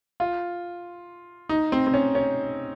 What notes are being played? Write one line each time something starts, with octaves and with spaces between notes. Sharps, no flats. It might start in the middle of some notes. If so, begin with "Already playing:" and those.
F4
D#4
C4
C4
C#4
C#4